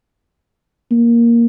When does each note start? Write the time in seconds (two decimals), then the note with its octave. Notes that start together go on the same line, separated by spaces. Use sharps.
0.91 A#3